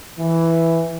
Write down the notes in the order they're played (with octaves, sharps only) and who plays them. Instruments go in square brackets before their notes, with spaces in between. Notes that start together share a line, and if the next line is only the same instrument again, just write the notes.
[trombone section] E3